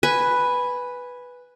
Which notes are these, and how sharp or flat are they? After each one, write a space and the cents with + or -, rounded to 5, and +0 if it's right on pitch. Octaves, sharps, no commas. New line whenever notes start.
B4 +0 G#5 -5